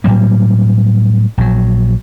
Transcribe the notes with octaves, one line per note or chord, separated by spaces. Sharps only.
A2 F#3 G3 A#3
A#1 F#3